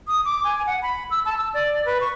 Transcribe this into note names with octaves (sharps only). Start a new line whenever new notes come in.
D#6
D6
G#5
F#5
B5
E6
A5
E6
D5
B4
C#6